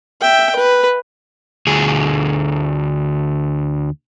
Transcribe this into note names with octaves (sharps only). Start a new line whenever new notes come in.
E5 G5
B4
D2 G#4